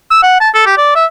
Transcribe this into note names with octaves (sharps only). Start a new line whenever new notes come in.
E6
F#5
A5
A4
G4
D5
E5